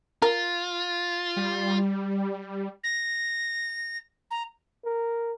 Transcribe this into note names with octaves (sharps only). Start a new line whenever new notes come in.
F4 A#4
G3
A#6
A#5
A#4